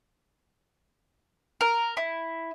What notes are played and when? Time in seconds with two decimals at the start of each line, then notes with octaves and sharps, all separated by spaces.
1.61 A#4
1.97 E4